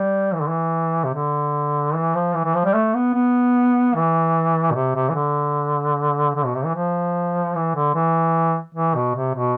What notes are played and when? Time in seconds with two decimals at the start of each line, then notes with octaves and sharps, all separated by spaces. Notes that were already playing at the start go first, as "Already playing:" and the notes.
Already playing: G3
0.34 E3
0.41 D3
0.49 E3
1.04 C3
1.14 D3
1.94 E3
2.15 F3
2.35 E3
2.45 E3
2.55 F3
2.65 G3
2.74 A3
2.95 B3
3.15 B3
3.95 E3
4.71 B2
4.75 C3
4.95 C3
5.10 E3
5.15 D3
6.35 D3
6.45 B2
6.55 C3
6.65 E3
6.75 F3
7.55 E3
7.76 D3
7.95 E3
8.75 E3
8.95 B2
9.16 C3
9.35 B2